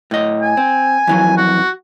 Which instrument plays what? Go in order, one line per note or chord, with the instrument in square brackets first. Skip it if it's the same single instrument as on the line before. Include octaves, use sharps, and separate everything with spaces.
[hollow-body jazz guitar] A2 D#5
[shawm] G#5
[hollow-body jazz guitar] C4
F2 E3 F#3
[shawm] F#4